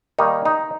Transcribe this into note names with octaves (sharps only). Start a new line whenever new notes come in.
D#3 G3 A#3 D#4
D#4